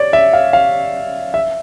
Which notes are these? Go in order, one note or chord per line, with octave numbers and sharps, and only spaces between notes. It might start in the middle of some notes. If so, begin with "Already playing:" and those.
Already playing: C#5 D5
E5
F5
F5
E5